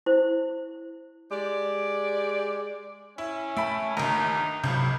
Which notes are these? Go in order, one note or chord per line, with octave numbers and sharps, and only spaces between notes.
E4 C5
G#3 G4 D5
C#4 E4
A3 E5 G5 A5 B5
G1 D#2 D#4 A#5
G#1 C#2 C3 F#3 B5 G6